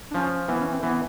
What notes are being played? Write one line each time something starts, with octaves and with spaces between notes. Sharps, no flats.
D4
F3 C#4
E3 B3
C#4
C4
E3 B3